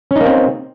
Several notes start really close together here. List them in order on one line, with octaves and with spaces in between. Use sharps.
C#4 D#4 A#3 C4